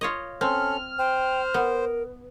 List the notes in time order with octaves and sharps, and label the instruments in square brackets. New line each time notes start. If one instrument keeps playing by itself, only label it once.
[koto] F4 C#5 D#5
[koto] C4 [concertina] C#4 A4 [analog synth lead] F6
[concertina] C5 [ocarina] G5
[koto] B3 [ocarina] A#4